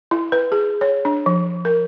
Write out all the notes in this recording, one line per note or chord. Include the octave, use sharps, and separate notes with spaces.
E4
B4
G#4
C#5
D4
F3
A#4